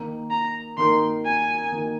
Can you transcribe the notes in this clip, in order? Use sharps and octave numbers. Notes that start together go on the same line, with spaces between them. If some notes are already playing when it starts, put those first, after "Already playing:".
Already playing: D#3 A#3 D#4 A#4
A#5
D#3 A#3 D#4 A#4 C6
G#5
D#3 A#3 D#4 A#4